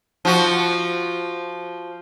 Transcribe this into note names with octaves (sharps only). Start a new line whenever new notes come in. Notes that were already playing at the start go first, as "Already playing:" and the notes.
F3 F#4